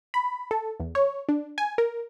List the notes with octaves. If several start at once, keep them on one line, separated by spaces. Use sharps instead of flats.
B5
A4
E2
C#5
D4
G#5
A#4